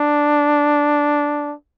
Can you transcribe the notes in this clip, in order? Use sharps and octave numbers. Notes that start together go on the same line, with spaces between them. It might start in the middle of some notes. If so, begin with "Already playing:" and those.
Already playing: D4